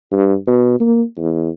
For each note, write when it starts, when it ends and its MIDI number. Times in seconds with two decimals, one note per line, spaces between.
0.12 0.35 43
0.47 0.76 47
0.80 1.03 58
1.18 1.49 40